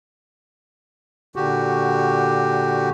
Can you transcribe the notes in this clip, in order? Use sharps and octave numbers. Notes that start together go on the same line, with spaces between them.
A#2 D3 F#4 G4